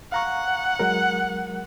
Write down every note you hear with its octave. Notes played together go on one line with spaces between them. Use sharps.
F5 F#5 A#5 C#6
F#3 G#3 A#4